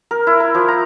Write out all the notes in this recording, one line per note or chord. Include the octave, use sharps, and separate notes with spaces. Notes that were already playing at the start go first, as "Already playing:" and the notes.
A#4
E4
A#4
F3
A#5